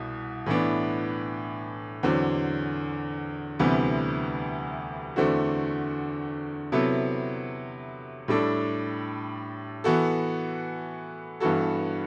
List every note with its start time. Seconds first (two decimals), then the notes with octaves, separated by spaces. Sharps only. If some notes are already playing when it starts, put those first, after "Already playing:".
Already playing: C2 B2
0.46 A2 E3 B3 D4
2.03 E2 D3 F#3 C4
3.59 D2 C3 E3 G3 B3
5.16 E2 D3 A3 C4 F#4
6.72 C3 F#3 B3 E4 A4
8.28 A2 G3 D4 A4
9.84 E3 B3 F#4 A4
11.40 G2 E3 B3 F#4 A4